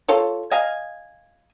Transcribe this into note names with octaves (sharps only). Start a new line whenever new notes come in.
F4 A4 C#5
D#5 F5 G#5